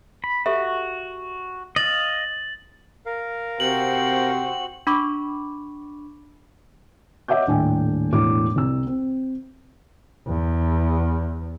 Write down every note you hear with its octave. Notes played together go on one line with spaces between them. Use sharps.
B5
F#4 G4 A4 E5
D#5 F5 A6 F#7
A#4 F5
C3 C4 F#4 F#7
D4 B5 C#6 D6
C#5 D#5 E5 F#5 D6 G6
D#1 A2 D4 G5 G#5
E1 A2 D4 E4 D6
C2 E6
C4
E2